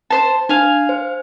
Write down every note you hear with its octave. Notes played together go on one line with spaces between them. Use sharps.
C5 A5
D4 F5 G#5
C5